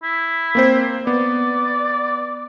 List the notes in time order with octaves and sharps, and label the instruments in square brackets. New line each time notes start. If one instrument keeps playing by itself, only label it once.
[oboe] E4
[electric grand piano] A#3 C4 C5
[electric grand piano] B3 [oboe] D5